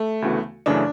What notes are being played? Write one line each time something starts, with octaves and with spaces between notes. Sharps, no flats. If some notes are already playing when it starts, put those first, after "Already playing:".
Already playing: A3
D2 C#3 E3 B3 F#4
F#2 C#3 E3 A3 C#4 D4